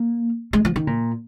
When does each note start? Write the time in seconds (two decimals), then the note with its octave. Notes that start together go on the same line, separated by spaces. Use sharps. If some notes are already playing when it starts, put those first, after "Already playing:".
Already playing: A#3
0.53 G#3
0.65 F3
0.76 D#3
0.87 A#2